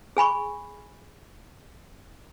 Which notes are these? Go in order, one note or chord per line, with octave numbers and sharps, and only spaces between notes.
G#4 G#5 B5 C#6